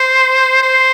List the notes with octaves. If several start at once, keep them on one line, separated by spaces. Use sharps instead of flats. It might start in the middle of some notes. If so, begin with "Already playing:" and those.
Already playing: C5
C5